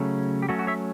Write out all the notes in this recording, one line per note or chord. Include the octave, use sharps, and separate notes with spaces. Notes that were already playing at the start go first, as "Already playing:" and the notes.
Already playing: C#3 F#3 A3 C#4
G4
F#3 A3 C#4 F#4
F#4
C#5 E5